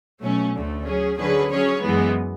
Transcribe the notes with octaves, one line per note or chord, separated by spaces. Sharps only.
B2 F#3 A3 C#4
D2 D3 A3
F#3 C#4 G#4
D3 F#3 C#4 G#4 B4
F#3 C#4 G#4 C#5
F#2 E3 G#3 B3